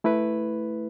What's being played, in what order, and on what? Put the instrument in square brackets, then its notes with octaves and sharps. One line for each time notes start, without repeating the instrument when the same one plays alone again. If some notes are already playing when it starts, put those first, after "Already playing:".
[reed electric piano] A3 E4 B4